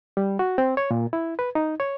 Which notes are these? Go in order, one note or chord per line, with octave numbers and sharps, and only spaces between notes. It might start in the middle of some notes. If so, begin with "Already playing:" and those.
G3
F#4
C4
C#5
A#2
E4
B4
D#4
C#5